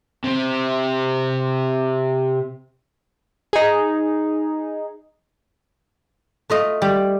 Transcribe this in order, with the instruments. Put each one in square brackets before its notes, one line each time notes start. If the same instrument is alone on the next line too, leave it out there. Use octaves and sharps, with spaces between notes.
[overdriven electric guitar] C3 C4
[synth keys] D#4 G#4
[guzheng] A3 F4 D#5
G3